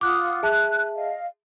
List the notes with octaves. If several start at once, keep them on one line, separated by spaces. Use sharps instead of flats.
F4 F#5 D6 D#6 F#6
G#4 E5 A5 F#6
D#5 F5